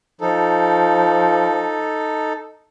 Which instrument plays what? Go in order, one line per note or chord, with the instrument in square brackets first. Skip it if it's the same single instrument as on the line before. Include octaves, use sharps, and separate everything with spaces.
[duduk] F3 [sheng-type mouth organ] D#4 A4